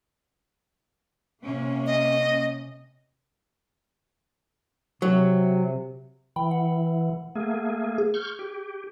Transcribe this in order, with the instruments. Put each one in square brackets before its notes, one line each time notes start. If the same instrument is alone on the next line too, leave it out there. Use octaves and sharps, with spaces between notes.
[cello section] C3 A#3 C#4
[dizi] D#5
[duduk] C3 [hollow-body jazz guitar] F#3
[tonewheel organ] E3 [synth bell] G5 B5
[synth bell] F#5
[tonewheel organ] A3 A#3 G#4
[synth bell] G#4
[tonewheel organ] C#6 F6 G6
G4